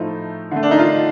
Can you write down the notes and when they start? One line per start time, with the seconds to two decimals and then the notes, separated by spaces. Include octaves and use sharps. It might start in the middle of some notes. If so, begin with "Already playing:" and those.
Already playing: A2 F3 A3 D#4
0.51 D3 A3
0.63 D4
0.71 D#4
0.78 F4